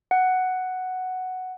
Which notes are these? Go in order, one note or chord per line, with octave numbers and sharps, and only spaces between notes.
F#5